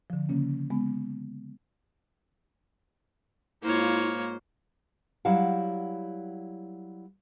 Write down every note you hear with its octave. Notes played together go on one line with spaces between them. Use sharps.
D3 F3
C#3 A#3 C#4
G#3 B3
G#2 A#3 E4 F4 C5 C#5
F#3 G3 E4 F5 F#5